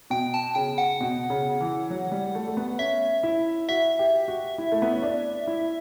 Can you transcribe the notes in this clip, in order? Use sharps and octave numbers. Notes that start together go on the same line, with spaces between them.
B2 G5
A5
C#3 G5
F#5
B2
C#3
E3
F#3
G3
A3
A3
B3
C#4 E5
E4
F#4 E5
G4
F#4
E4
A3
B3
C#4
D4
E4